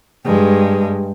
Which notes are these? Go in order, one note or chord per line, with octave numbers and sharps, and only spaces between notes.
G2 G#3